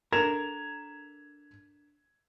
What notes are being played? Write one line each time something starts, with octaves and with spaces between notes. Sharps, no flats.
D4 A4 A#4 G#6 E7 F7